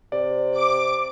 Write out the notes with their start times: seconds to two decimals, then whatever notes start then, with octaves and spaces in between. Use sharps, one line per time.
0.12 C3 D5
0.56 D6